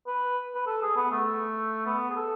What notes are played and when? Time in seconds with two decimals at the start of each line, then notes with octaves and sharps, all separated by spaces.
0.07 B4
0.55 B4
0.67 A4
0.82 G#4
0.96 B3
1.11 A3
1.86 B3
2.10 G#4
2.16 A4